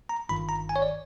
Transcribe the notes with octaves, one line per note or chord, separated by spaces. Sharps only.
A#5
G1 G2 D#3 B5
A#5
G#5
C#5
D5